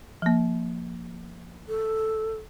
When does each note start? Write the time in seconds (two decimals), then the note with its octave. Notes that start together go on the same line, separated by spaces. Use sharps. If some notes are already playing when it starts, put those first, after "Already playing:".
0.22 F3 A#3
1.68 A4